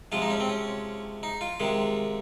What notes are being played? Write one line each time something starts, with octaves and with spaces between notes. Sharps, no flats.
C3 F3 G#3 F4
D#4
C#4
C4
C#4
D#4
F4
C3 D#3 G#3